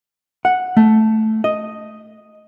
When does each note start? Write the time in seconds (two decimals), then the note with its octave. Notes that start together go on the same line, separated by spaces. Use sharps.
0.45 F#5
0.77 A3
1.44 D#5